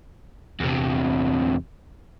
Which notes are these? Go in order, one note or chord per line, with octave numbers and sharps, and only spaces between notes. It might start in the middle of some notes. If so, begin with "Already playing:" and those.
E2 C3